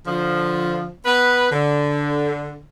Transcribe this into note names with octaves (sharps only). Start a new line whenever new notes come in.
D3 F3
B3 B4
D3